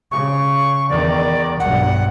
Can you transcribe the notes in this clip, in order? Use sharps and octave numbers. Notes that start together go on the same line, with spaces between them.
C#3 C#6
E2 D#3 D5
B1 G2 F#5